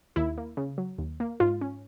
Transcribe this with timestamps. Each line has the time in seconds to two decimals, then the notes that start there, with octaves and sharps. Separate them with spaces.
0.16 D#2 E4
0.38 A#3
0.57 C#3
0.78 F#3
0.99 D#2
1.20 A#3
1.40 G#2 F4
1.61 C#4